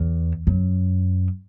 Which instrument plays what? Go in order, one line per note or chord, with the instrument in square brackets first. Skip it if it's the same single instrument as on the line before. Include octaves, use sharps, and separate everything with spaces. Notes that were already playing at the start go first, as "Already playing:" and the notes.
Already playing: [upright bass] E2
F#2